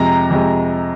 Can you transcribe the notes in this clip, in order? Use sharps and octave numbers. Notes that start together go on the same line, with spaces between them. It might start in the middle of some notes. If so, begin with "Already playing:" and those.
Already playing: F2 C3 G#3 A#5
F2 C3 G#3